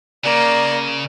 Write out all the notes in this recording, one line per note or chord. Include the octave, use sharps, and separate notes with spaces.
C#3 A#3 D5